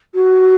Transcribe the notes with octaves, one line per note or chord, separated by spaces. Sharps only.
F#4